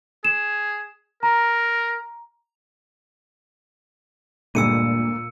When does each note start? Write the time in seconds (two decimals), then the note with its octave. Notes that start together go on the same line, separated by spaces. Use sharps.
0.25 G#4 E7
1.23 A#4 A#5
4.55 D2 G2 A#2 G#3 A#3 E6 C#7 D#7